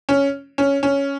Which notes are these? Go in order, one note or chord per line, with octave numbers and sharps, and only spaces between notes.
C#4
C#4
C#4